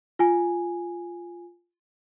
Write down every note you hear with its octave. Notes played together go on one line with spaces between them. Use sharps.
F4 G#5